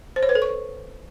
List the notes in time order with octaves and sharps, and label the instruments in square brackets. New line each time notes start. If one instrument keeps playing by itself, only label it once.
[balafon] C5
C#5
B4
A4
C#6